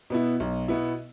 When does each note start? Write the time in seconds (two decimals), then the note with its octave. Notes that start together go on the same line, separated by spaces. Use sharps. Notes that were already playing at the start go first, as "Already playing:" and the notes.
0.10 B2 B3 E4
0.40 B1
0.68 B2 B3 E4